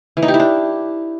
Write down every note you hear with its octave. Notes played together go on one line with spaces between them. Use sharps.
E3
D#4
G4
E4
D4